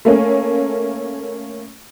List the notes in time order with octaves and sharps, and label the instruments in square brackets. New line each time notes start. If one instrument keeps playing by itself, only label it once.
[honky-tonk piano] A3 A#3 C#4